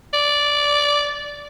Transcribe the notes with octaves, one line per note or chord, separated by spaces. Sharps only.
D5